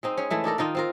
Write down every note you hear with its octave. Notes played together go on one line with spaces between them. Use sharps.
G#3 C4 D#4
C#4 G#4
E3 G#3 A3 E4
D4 D#4 A4 A#4
D#3 D#4 F4 A#4
C4 F4 A#4